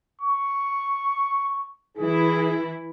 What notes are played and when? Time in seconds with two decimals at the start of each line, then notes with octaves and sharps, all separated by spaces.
0.22 C#6
1.98 E3 E4 G#4